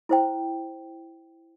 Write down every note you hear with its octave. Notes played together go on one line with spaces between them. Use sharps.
E4 C5 G5